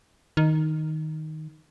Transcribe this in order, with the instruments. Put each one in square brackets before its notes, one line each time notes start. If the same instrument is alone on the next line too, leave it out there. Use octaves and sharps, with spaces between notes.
[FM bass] D#3